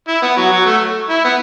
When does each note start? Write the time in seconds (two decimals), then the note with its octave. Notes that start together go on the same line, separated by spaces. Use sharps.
0.08 E4
0.22 B3
0.37 F#3
0.52 F#3
0.66 A3
1.09 E4
1.24 B3